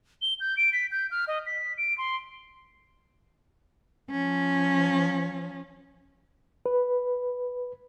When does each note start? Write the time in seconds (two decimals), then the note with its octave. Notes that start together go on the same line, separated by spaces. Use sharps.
0.22 G7
0.40 G6
0.57 D7
0.73 B6
0.91 G6
1.11 F6
1.28 D#5
1.46 B6
1.78 D7
1.98 C6
4.11 F3 C#4
6.66 B4